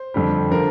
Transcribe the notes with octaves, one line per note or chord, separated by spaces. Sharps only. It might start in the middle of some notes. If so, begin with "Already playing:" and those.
Already playing: C5
F2 D3 G3
D3 F3 A#4